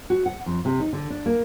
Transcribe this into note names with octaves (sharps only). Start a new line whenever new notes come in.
F#4
F#5
F2
C3
D#4
D3
D4
A#3